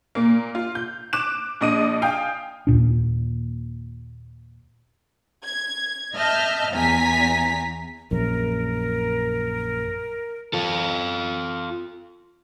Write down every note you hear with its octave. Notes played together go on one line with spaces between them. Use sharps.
A#2 A#3
F4
G6
D6 F#6 E7
A#1 D4 D#5 D#6 D#7
F5 G5 G#5 D#6
D#2 A#2 D4
G#6
D#5 E5 A5 F6 G6
E2 G#5 A#5 B6
A#1 F#2 A#4
F4 A4